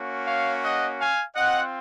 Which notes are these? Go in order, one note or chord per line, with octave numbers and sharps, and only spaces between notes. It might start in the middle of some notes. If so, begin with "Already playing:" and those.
Already playing: A#3 C#4 F#4
C#5 F5
D#5 F#5
F5 G#5
C4 F4 D#5 F#5